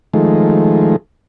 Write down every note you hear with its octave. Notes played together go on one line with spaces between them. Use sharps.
D#3 F3 G#3 A3